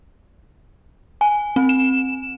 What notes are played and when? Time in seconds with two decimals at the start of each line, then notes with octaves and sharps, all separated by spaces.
1.21 G#5
1.56 C4
1.69 E7